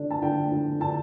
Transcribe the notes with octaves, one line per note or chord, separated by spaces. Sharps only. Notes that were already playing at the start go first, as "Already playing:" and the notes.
Already playing: D3 D4
A5
D3 G5
D3
D3 A5